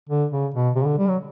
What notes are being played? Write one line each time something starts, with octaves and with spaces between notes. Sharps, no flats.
D3
C#3
B2
C3
C#3
D3
G3
F#3